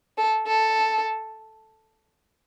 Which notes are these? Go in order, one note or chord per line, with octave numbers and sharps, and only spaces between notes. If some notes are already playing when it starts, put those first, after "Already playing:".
A4
A4